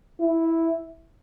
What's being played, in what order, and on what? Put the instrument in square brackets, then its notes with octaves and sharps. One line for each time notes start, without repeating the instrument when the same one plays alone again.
[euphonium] E4